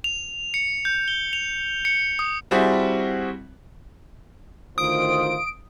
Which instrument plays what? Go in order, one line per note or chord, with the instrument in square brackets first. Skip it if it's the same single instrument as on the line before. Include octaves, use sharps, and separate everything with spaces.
[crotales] F7
C#7
G6
G7
F7
C#7
D#6
[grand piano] G3 C4 E4 F#4 G#4
[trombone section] D2 D#3 [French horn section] F4 C5 [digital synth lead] D#6 [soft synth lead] D7